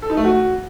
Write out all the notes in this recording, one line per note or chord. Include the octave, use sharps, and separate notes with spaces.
A4
D#4
A3
F#4